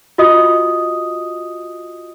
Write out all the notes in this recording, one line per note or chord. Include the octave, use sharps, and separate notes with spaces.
F4 F#4 D#5 D#6